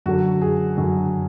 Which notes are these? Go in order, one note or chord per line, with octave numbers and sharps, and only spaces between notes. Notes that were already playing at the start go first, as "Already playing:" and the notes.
F#2 D3 F#3 F#4
G#4
F#2 D3 F#3 F#4